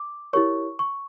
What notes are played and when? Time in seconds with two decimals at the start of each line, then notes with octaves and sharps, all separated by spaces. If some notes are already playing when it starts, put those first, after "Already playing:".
Already playing: D6
0.33 E4 G4 A#4 C#5 C#6
0.79 C#6